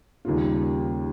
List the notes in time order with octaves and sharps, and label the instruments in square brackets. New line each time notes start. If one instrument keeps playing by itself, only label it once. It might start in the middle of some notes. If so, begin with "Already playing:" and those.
[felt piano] D#2 C#3 G3 A#3 F4